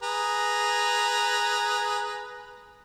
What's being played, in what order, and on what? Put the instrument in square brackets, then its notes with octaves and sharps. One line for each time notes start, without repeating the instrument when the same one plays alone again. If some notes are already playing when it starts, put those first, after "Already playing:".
[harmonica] G#4 B4 A#5